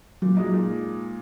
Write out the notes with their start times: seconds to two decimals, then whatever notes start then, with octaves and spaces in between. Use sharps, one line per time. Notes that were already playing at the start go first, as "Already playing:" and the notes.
0.22 A#2 F#3
0.37 G#3 D#4
0.53 A#2